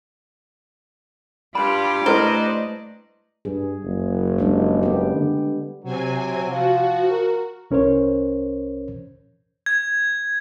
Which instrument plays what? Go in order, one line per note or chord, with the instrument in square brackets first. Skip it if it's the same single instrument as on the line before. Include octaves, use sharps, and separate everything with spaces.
[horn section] G2 D5 [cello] F4 G4 [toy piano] B5
[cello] A3 D#5 [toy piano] E4 B4 [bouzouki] C5
[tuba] G2 [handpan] G#4
[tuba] F#1
[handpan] G3 G#3 D4
B3 G4
[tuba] D3
[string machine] C3 C4 G#5 [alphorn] F#3
[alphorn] F3 [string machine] F#4
[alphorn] A#4
[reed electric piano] C2 C#4 A#4 C5 C#5
[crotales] G#6